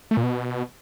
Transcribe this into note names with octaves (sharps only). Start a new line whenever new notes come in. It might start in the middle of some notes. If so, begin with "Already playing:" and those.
A3
A#2
B2